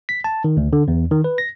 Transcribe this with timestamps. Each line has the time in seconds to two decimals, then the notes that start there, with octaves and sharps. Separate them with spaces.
0.09 B6
0.24 A5
0.44 D#3
0.57 D2
0.73 D3
0.88 E2
1.11 D#3
1.24 B4
1.38 A#6